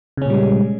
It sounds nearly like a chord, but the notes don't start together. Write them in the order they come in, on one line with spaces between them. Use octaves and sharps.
C#3 C#4 A#2 G3 G#3